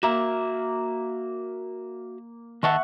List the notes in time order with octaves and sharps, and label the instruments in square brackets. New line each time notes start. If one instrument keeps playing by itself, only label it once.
[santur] A#3 [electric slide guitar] F#4 E5
[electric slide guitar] D#3 D#5 A5 [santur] E5 F#5 C#6